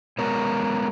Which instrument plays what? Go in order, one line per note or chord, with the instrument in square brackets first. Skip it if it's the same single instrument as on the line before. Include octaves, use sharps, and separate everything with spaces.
[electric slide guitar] G#3 B3 A#4 C#5